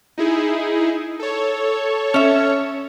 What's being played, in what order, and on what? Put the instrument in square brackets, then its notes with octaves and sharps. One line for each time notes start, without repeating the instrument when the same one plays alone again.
[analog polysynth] D#4 E4 G#4
A4 C#5
[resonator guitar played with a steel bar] C#4 E5